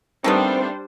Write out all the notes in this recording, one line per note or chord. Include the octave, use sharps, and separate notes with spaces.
D#3 G3 A3 B3 C4 D4 C5